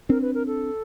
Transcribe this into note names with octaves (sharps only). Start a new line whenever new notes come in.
C4 D4 A#4
B4
A#4
A4